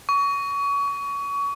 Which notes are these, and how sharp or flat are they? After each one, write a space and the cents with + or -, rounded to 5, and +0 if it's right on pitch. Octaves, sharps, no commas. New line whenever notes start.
C#6 +30
C#6 +25